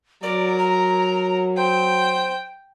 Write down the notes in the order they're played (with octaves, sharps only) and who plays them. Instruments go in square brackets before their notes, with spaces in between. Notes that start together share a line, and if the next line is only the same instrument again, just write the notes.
[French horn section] F#3 [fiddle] A#4 [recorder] D5
[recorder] A#5
[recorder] C5 [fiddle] G5